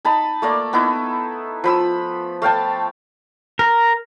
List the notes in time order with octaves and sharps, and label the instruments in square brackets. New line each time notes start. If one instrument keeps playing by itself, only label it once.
[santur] D#4 A5 B5
A3 A#3 D5
B3 D#4 E4
F3 B5 E6
A3 F5 G5 A5
[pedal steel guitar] A#4